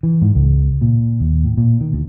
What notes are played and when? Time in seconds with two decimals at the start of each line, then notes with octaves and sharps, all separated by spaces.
0.03 E3
0.22 G#2
0.35 C#2
0.81 A#2
1.20 D#2
1.45 A2
1.58 A#2
1.81 D#3
1.93 D2